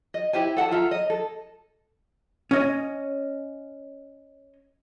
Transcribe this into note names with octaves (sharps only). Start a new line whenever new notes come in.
D#5
E4 G4 C5 G#5
A4 F#5 G#5 A5
F4 A4 E5 A#5
D#5
A4
C#4 D#5